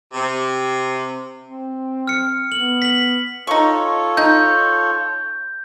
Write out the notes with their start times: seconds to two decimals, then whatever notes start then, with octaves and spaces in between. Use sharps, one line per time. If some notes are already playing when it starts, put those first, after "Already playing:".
0.13 C3
1.44 C4
2.07 F6 C#7
2.52 B3 F#7
2.82 B6 F#7
3.47 D#4 F4 A4 C#5 C#6
4.17 D#4 G6